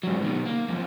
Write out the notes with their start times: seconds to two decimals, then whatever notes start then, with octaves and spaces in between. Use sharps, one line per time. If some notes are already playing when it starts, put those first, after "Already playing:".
0.03 G#2 F#3
0.22 B2 D#3
0.45 A#3
0.69 F#2 F3